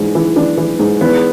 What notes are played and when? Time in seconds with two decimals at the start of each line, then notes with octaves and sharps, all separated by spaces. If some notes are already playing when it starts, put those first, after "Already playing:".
Already playing: G#2 E3 D4
0.15 E3
0.36 E3 D4
0.58 E3
0.79 G#2
1.01 E2 B3